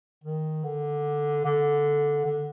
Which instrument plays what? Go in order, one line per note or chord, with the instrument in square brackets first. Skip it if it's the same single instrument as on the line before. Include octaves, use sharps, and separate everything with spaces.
[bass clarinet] D#3
D3
D3
D3